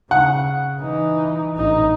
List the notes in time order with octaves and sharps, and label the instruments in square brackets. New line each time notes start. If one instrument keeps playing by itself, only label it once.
[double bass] C#3 [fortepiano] F#5
[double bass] E3 D#4
A1 D#4